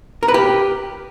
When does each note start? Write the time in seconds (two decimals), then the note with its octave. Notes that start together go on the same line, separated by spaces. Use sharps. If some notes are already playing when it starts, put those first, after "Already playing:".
0.23 A#4
0.28 B4
0.34 G4